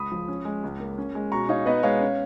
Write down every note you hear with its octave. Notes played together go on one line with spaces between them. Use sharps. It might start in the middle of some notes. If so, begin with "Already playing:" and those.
Already playing: C#2 B5 D#6
F3
C#4
G#3
C#2
A#3
C#4
G#3
B2 A#5 C#6
D#4 C#5 F5
B3 B4 D#5
G#3 C#5 F5
C#4